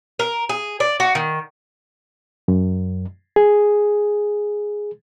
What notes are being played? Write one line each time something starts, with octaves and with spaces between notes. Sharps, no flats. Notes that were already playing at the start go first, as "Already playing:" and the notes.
A#4
G#4
D5
F#4
D#3
F#2
G#4